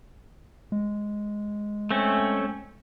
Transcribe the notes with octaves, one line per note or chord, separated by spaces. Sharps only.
G#3
A3 C4 C#4